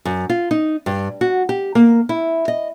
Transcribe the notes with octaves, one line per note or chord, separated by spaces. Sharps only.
F#2
F4
D#4
G2
F#4
G4
A#3
E4
D#5